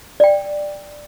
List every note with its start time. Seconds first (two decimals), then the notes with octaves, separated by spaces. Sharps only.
0.20 D5 G5